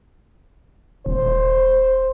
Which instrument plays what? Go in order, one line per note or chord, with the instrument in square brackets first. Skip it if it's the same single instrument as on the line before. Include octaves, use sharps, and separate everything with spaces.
[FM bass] D#1 [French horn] C5